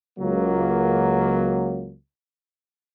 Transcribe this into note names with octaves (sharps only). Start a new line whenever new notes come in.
C#2 F#3 A#3